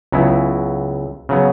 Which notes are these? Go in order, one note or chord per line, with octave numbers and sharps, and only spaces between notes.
C#2 C#3 F#3 B3 E4
C#3 F#3 B3